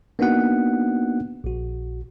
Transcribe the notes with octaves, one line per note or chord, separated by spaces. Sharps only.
A#3 B3 D4 D#4 F#4 F#5
A#1 F#4